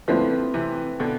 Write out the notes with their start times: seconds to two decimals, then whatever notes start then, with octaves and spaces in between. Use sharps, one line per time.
0.08 D3 F3 A3 C4 E4 B4
0.54 C3 E3
1.00 B2 D3